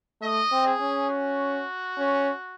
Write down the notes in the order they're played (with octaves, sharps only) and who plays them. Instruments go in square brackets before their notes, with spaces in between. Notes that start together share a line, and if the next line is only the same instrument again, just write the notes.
[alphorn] A3 [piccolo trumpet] D#5
[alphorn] C4
[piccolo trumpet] G#4
[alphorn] C#4
[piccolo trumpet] F#4
[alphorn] C#4